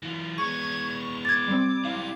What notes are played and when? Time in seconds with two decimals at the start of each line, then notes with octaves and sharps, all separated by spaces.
0.03 E3 F4
0.38 G#3 B3 C#6 G#6
1.25 D6 G#6 A6
1.47 G3 C4
1.85 E4 G4 F5